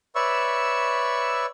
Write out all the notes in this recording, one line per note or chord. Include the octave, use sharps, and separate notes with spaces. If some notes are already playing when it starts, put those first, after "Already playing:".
B4 C#5 D5 E5 C#6 E6